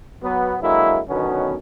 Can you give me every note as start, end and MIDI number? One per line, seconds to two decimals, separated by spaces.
0.23 0.55 54
0.23 0.55 59
0.61 0.99 50
0.61 0.99 54
0.61 0.99 56
0.61 0.99 58
0.61 0.99 64
1.08 1.55 47
1.08 1.55 50
1.08 1.55 51
1.08 1.55 54
1.08 1.55 59
1.08 1.55 61